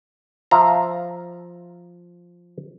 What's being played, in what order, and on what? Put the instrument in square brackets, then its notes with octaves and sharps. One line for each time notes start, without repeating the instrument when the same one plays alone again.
[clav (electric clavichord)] F3 E5 F5 A#5